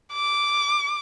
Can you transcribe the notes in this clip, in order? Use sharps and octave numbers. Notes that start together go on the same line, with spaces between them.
D6